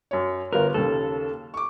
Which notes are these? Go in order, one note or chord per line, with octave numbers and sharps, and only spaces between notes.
F#2 C#5
G1 F4 A#4 B4
D#2 C#3 A4
C#6 D6